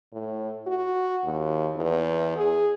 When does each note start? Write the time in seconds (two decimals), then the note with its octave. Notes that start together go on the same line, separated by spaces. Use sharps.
0.13 A2
0.67 F#4
1.24 D#2
1.76 E2
2.37 G#4